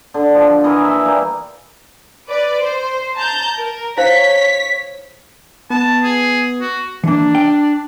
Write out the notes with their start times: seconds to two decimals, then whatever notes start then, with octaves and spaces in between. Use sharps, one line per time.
0.14 D3
0.34 F3
0.64 E3 E4 A#4 D#5
0.85 E5 G#5
1.05 G3 A#3 D#4
2.27 B4 D5
2.59 C5
3.15 A5 A#5 G6
3.59 A#4
3.97 E4 C5 C#5 F5 B6
5.70 B3 A5
6.04 G#4
6.61 F#4
7.04 E3 A#3 D4
7.35 G5